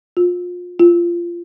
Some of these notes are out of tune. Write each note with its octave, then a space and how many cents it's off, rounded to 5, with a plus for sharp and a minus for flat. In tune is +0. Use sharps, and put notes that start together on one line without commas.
F4 +30
F4 -20